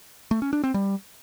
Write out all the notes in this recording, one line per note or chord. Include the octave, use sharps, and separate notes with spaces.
A3
C#4
D4
C4
G3